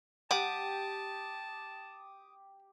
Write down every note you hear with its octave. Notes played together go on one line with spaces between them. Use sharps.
G3 G4 F#5 A5 D6 D#6